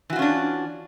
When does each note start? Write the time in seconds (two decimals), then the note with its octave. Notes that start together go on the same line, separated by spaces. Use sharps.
0.10 E3
0.13 F#4
0.16 F4
0.19 C#4
0.22 D4